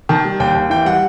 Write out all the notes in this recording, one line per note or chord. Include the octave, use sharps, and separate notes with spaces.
D#3 A5
G3
D#2 G5
D#2
E3 G5
G3 F#5